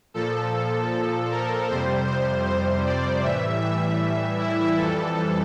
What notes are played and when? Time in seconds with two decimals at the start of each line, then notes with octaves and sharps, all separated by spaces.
0.14 A#2 F3 A4
1.31 A#4
1.69 F2 C3 G3 C5
2.07 C5
2.46 C5
2.84 D5
3.23 A2 E3 G3 E5
3.62 E5
4.39 E4
4.77 F2 E3 G3 A4